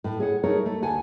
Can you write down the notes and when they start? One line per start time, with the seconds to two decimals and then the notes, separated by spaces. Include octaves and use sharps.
0.04 A2
0.20 G#4 C#5 F#5
0.43 A3 D#4 G#4 A#4 C#5
0.66 A3
0.82 D2 F#5 G#5 A5